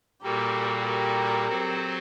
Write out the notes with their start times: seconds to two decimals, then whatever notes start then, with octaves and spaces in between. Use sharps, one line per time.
0.22 A#2 G3 A#3 F#4 G4 A4 A#4
0.86 G4 A#4
1.47 F#3 C4 F#4 A4 C5